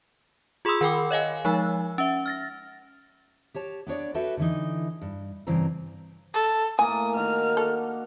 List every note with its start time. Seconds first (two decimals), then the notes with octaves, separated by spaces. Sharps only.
0.65 F4 G#4 B5 C6 D#6 E6
0.81 D#3 A#4 G5 D6
1.11 C#5 D#5 F5 G#5
1.45 F3 G#3 D#4 E6
1.98 C#4 E5
2.26 F6 A6 A#6
3.54 G4 C#5 A5
3.87 B3 D4 C#5 D5
4.14 F#4 G4 A4 B4 E5
4.37 D3 E3 D#4
5.02 G2
5.47 G2 C#3 E3 C4 A#5
6.34 A4
6.79 A2 A#3 G#5 A5 D#6
7.15 D#3 F#4 F6
7.57 F#4 A4 D5